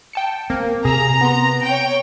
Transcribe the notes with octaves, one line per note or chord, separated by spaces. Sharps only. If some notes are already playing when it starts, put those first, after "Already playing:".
G5 A5 C#7
A#3 C4
C3 G#4 A#5 E6
B3 C6
C#5 G5